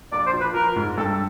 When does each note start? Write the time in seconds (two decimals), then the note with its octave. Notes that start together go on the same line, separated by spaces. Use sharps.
0.12 A#1 D5
0.26 C5
0.33 F3
0.41 B4
0.54 F3 A#4
0.76 G#2
0.98 G2 A4